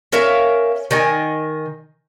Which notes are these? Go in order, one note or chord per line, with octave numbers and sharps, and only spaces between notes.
C#4 A#4 E5 F5
D#3 D#5 G#5